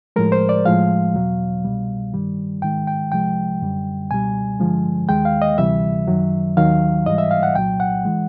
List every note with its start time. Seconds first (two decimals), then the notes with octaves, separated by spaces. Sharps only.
0.16 A2 F3 G#3 A#4
0.32 C5
0.49 D5
0.65 A2 F3 G#3 F5
1.14 E2 B2 F#3
1.65 C2 B2 G3
2.13 G2 D#3 G3
2.62 G#2 D#3 G#3 G5
2.87 G5
3.12 C2 C3 F3 G#3 G5
3.61 F#2 D3 G3
4.10 C#2 B2 G3 G#5
4.60 G2 D3 F3 G#3
5.09 D#2 D#3 G#3 G5
5.25 F5
5.42 D#5
5.58 D2 C3 E3 G3 E5
6.07 F#2 D#3 F#3
6.57 D#2 D#3 F#3 F5
7.06 G#2 E3 G3 D#5
7.18 E5
7.31 F5
7.43 F#5
7.55 C2 A#2 F#3 G5
7.80 F#5
8.05 E3 G#3